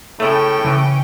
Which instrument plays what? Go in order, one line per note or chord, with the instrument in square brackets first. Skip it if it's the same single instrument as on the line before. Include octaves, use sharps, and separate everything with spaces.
[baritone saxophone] A2 [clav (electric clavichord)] C#3 A3 [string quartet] C#4 G5
[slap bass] C#3 [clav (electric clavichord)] E3